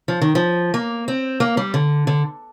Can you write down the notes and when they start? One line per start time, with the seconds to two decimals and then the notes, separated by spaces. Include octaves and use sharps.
0.08 F3
0.21 D#3
0.35 F3
0.74 A#3
1.08 C4
1.40 A#3
1.57 G3
1.74 D3
2.07 D3